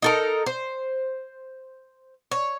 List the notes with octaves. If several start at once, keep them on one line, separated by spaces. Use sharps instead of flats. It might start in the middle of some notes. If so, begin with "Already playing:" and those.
D#4 A4 A#4
C5
C#5